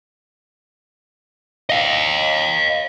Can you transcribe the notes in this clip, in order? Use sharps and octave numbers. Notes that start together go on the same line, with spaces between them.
D#5 F5